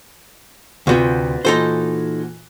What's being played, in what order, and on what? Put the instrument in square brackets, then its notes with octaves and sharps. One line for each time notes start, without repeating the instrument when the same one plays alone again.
[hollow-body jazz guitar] D2 C3 [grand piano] F4 F#4 B4
[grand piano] A#2 E3 F#4 [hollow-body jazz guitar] D#4 A4 C5